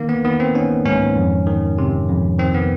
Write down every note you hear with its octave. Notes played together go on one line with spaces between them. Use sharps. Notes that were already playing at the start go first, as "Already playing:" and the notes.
Already playing: D#3 A#3
B3
D#3 B3
C4
D#3 C#4
G#2 C#4
F2
D#3
C3
F2
D#3 C4
B3